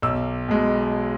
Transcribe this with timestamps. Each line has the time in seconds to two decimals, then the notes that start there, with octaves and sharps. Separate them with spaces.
0.02 B1 E6
0.49 B2 G#3